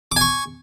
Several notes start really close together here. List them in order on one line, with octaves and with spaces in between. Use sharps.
D6 G#5 C#6